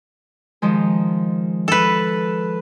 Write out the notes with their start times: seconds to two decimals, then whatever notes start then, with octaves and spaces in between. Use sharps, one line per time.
0.62 D#3 F3 G#3
1.68 A4 B4